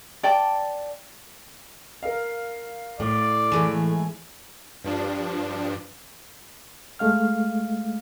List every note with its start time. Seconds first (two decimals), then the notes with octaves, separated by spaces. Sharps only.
0.23 D5 G5 A5 D6
2.03 A#4 F5
3.00 A2 D5
3.52 E3 G#3 A3
4.84 G2 F3 D4
6.99 G#3 A3 F5 F6